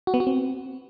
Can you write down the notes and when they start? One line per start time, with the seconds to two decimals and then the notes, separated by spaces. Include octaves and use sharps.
0.07 F#4
0.14 B3
0.20 F#4
0.27 C4